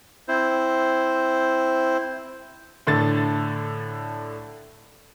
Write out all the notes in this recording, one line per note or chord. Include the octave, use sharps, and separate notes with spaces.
C4 E4 C5
A2 D3 A4 A6